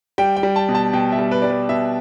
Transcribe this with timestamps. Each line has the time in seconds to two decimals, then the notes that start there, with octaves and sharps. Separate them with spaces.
0.18 G3 G5
0.37 G5
0.43 G3
0.56 A5
0.68 B2
0.75 A5
0.93 B2 G5
1.12 E5
1.19 G3
1.31 B4
1.42 G3 D5
1.50 B4
1.69 B2 E5